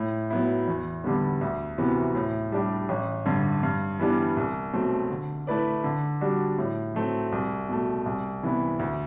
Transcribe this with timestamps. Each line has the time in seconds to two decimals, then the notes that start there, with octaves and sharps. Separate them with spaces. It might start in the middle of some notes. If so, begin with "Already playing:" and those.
Already playing: A2
0.30 F#3 B3 E4
0.68 E2
1.04 D3 G3 B3
1.41 D2
1.78 C3 E3 B3 F#4
2.15 A2
2.52 G3 D4 G4
2.89 A1
3.26 G2 D3
3.63 G2
3.99 E3 G3 B3 D4
4.37 C2
4.73 B2 F#3 A3 C4
5.10 D3
5.47 A3 E4 B4 D5
5.84 D3
6.21 G3 D4 F#4
6.58 A2
6.94 F#3 A3 C4
7.32 C2
7.69 B2 A3
8.06 C2
8.43 C3 E3 B3 E4
8.79 D2